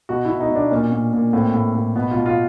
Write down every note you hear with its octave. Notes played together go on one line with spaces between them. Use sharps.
B2 F#4
B2 E4
D#4
B2 D4
A#2 C#4
A#2
A#2
A2 C4
A2
A2
B2 B3
B2 F4
F4